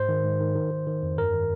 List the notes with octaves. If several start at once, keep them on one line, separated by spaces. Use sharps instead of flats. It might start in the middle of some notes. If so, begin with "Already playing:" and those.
Already playing: G#2 C5
D#3
G#2
D#3
D#3
D#3
D#3
F2
G2 A#4
D#3